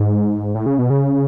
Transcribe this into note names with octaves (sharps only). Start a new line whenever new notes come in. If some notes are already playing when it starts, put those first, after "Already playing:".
Already playing: G#2
A2
C#3
B2
C#3